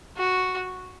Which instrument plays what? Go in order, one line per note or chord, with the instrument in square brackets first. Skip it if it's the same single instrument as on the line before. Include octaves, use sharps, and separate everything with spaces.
[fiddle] F#4